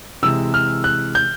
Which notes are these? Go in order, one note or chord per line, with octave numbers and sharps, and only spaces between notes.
C3 E3 G#3 E6
F6
F#6
G6